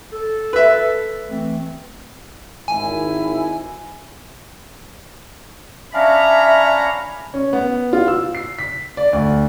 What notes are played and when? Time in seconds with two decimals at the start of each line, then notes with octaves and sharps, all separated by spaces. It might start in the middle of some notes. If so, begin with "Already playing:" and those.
0.12 A4
0.53 B4 E5
1.28 E3 A3 C4
2.68 G#1 D#3 E4 G#5
5.94 C#4 D4 C#5 E5 F5 A#5 B5
7.34 C#4
7.53 B3
7.93 F4
8.08 E6
8.35 C7
8.59 B6
8.97 D5
9.13 D2